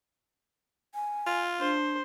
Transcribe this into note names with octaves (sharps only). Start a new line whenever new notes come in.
G#5
F4
D4 C5